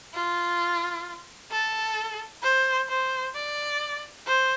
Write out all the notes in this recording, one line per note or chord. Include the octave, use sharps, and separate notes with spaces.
F4
A4
C5
C5
D5
C5